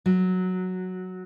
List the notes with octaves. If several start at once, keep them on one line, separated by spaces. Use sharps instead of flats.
F#3